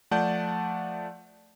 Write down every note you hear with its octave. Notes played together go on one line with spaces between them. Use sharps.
F3 A3 D5 F#5 A5 G6